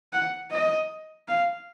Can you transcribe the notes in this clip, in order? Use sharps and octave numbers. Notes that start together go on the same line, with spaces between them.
F#5
D#5
F5